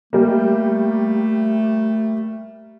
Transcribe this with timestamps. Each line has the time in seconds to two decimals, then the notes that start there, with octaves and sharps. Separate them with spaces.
0.13 G3 A3 A#3